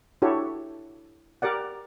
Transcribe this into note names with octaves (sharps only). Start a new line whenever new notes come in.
D4 E4 F#4 G4 A4 C#5
G4 A#4 D5 F#5